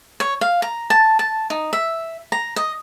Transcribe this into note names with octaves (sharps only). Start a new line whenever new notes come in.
C#5
F5
A#5
A5
A5
D#4
E5
A#5
D#5